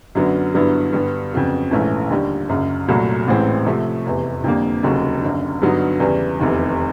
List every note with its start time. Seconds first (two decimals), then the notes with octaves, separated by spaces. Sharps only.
0.15 F#2 D3 F#3 B3
0.54 G2 D3 F#3 B3 E4
0.93 G2 D3 G3 B3
1.33 F2 C#3 F#3 B3
1.71 A#1 G#2 E3 A3 C#4
2.10 D#2 D3 G3
2.49 F#1 F#2 C#3
2.88 C2 A#2 F#3 A3
3.27 A1 A2 E3 G#3 C4
3.66 C3 F3 A3
4.05 F1 E2 C3 E3
4.44 F2 D3 G3 A#3
4.83 F1 D#2 C#3 F#3
5.22 F#1 F#2 D3
5.62 G2 D3 F#3 B3 D#4
6.00 E2 C#3 E3 G3
6.39 F1 E2 C3 D#3